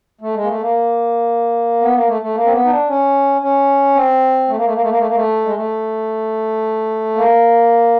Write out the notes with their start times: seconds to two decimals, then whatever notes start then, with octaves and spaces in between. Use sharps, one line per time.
0.21 A3
0.34 G#3
0.43 A#3
0.48 A3
0.61 A#3
1.81 B3
1.94 A#3
2.08 A3
2.22 A3
2.35 A#3
2.45 C4
2.52 B3
2.64 D#4
2.70 D4
2.88 C#4
3.42 C#4
3.95 C4
4.48 A3
4.57 A#3
4.65 A3
4.73 A#3
4.82 A3
4.90 A#3
4.99 A3
5.07 A#3
5.15 A3
5.45 G#3
5.56 A3
7.16 A#3